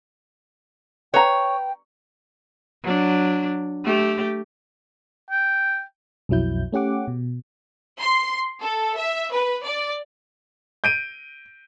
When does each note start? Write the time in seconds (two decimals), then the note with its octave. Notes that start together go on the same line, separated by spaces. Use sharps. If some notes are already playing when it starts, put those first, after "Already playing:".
1.14 B4 C#5 G5 A#5
2.83 F#3 D4
3.84 A3 G4
5.30 G5
6.29 B1 F2 F#3 E4 G6
6.72 A3 C#4 G4 F#5 D6
7.08 B2
8.00 C6
8.61 A4
8.98 E5
9.32 B4
9.65 D5
10.84 G6 D7 D#7